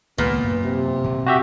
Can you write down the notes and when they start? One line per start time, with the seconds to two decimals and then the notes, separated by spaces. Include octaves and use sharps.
0.18 C#2 A#2 D#3 G#3 B3
0.44 F#2
0.63 C3
1.04 D#1 A#2
1.26 C4 F#4 G4 E5